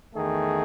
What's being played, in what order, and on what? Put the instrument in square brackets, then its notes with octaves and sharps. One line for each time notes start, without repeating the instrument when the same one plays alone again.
[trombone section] E2 D#3 A3 G#4